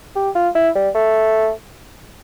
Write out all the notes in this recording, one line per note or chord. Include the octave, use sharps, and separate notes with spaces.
G4
F4
E4
G3
A3